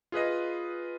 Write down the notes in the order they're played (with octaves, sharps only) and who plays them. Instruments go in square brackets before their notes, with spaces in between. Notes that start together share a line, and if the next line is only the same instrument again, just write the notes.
[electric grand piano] F4 G#4 B4 D#5